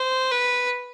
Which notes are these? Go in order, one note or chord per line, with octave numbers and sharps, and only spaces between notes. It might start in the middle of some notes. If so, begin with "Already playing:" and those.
Already playing: C5
B4